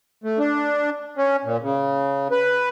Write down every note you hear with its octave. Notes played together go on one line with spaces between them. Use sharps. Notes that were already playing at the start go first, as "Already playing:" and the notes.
A3
D4
C#4
A#2
C#3
B4